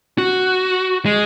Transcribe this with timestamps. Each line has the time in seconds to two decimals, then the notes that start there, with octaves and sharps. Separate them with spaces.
0.18 F#4
1.06 G#3